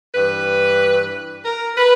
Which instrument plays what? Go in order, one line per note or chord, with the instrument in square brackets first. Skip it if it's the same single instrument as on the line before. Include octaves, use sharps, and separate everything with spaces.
[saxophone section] G2 E3 B4
A#4
B4